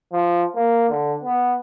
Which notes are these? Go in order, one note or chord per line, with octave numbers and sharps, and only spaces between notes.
F3
A#3
D3
B3